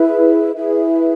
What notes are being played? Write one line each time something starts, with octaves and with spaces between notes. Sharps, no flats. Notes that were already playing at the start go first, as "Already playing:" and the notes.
Already playing: E4 G#4 B4 E5
E4 G#4 B4 E5